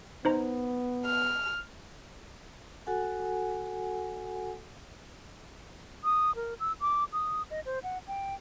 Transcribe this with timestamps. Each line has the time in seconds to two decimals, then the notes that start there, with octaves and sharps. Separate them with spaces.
0.25 B3 D#4 C5 A#5
1.06 F6
2.87 F#4 A4 F#5 G#5
6.04 D#6
6.36 A#4
6.60 E6
6.81 D6
7.13 D#6
7.51 D#5
7.66 C5
7.83 F#5
8.08 G5